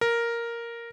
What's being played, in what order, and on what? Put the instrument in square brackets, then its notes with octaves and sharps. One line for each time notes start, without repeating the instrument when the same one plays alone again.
[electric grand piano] A#4